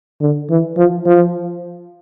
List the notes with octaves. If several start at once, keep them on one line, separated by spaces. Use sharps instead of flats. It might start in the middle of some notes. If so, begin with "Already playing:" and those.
D3
E3
F3
F3